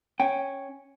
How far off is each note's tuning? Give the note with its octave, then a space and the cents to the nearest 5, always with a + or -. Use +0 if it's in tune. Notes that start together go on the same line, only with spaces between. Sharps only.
C#4 -5 G5 +0